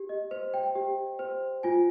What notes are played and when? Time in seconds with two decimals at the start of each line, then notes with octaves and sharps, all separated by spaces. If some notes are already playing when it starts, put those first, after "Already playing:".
Already playing: G4
0.09 D#5
0.31 C5
0.54 G5
0.75 G4
1.19 C5
1.63 F4 G#5